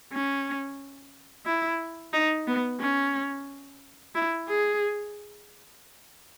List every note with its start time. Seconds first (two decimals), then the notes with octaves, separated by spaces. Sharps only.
0.12 C#4
1.46 E4
2.13 D#4
2.48 B3
2.80 C#4
4.15 E4
4.48 G#4